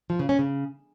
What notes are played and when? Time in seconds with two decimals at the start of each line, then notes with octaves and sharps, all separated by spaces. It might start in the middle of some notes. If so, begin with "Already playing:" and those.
0.10 F3
0.19 C#3
0.29 C#4
0.39 C#3